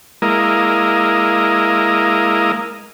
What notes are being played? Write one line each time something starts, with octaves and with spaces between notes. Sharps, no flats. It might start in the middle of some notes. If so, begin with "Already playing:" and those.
G#3 A#3 E4 A#4 D#5 F5